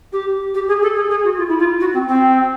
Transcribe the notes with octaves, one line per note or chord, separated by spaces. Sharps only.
G4
G4
G#4
A4
G#4
G#4
F#4
F4
E4
F4
F#4
C4
C4